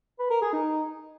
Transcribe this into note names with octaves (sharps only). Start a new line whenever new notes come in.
B4
A#4
G#4
D#4